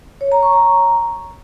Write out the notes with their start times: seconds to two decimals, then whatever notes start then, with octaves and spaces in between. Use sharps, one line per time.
0.21 C#5
0.32 A#5
0.42 C#6
0.53 A#5